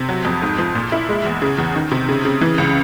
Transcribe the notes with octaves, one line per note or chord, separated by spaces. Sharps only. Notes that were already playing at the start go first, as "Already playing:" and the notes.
Already playing: C3
F#3
F2
G#2
F3
A#2
E4
G#3
E2
C#3
E2
D#3
C3
C#3
C#3
E3
C#2